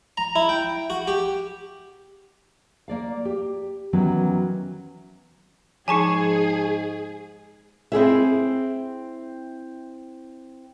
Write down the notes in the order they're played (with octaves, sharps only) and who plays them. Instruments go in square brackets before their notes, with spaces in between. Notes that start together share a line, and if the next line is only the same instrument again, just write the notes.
[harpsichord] A#5
E4
G5
F#4
G4
[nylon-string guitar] A#3 D5 F5
G4
D#3 E3 F#3 B3 C#4
[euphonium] G#2 [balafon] F3 D#4 [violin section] G#4 [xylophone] G#5 A5 C#6
[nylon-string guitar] C4 E4 G#4 E5